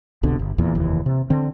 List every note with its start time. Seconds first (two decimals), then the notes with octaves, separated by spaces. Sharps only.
0.23 F1 C2 B2 D3
0.39 G1
0.58 D#1 E2 A#2 E3
0.75 F1 D#2 E3
1.06 C3
1.30 D3 C4